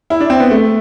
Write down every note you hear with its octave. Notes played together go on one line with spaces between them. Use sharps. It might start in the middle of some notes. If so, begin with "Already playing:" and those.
E4
D4
C4
B3
A3